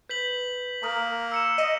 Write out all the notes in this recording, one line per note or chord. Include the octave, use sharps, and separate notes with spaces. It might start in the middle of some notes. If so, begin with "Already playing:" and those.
B4 G6 B6 F#7
A#3 A#5 D#6 F6
E6 C#7 E7
D#5